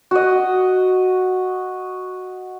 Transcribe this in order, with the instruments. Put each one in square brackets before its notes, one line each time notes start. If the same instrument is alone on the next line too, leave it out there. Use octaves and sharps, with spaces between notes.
[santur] F#4 D#5